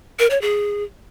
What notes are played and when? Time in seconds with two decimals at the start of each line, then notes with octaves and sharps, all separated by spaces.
0.19 A#4
0.30 C#5
0.42 G#4